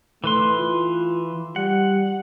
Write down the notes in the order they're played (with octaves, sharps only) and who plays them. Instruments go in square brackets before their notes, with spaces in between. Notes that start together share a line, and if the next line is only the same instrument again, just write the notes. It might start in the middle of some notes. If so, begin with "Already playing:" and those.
[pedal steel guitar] E3 B4 C6 [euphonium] A3
[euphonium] F4
[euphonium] G3 [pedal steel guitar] F#5